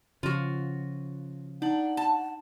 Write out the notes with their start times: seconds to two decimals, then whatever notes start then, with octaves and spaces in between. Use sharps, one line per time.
0.23 C#3 F3 F4 F#4
1.62 D4 D#4 F#5 F#7
1.97 A5